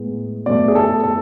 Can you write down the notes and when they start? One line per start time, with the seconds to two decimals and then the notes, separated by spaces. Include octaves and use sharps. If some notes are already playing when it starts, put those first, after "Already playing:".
Already playing: A2 G#3 B3
0.46 B2 A3 D5
0.68 G#4
0.75 A4
1.03 A4